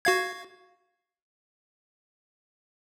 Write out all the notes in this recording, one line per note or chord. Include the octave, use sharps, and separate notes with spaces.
F#4 F5 G#6